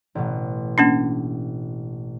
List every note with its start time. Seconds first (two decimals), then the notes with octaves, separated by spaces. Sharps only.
0.15 A1 B2
0.78 A#3 C#4 D4